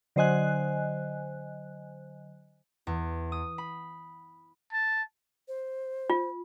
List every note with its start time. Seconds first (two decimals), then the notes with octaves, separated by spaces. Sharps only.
0.16 D3 F#3 C5 D#5 G#5 F#6
2.87 E2
3.32 D#6
3.58 B5
4.73 A5
5.48 C5
6.10 F4